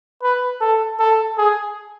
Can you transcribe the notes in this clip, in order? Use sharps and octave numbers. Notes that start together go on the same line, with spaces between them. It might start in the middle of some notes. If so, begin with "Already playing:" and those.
B4
A4
A4
G#4